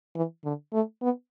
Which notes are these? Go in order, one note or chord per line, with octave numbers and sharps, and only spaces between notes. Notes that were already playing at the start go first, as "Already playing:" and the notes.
E3
D3
A3
B3